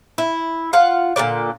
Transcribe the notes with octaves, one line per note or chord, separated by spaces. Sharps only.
E4
F4 F5 F#5
A#2 D3 B3 D5